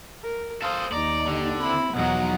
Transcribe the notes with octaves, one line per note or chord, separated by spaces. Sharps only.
A#4
A4 C5 F5 D#6
D#2 D#4 D5 A#5
D3 G4
C4 E4 B5
B1 E2 F3 F#3 D#4 F#5